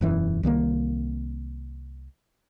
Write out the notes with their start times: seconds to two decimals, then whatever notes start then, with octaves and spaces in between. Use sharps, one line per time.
0.01 E1 F#2 E3
0.43 C2 D#3 G3 A#3